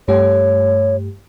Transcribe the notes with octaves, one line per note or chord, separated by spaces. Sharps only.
G2 A3 G4 C#5